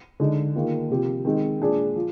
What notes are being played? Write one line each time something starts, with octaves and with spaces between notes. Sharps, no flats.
D3 G#3 D#4 G#4
D#3 A#3 F4 G#4
C3 F3 C4 G4
D#3 G#3 C4 D#4
A#2 G#3 D4 G#4
F3